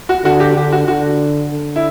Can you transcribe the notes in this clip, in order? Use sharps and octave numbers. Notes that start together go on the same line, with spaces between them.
F#4
D3 F#4
G4
D3 G4
F#4
D3 F#4
D3
E4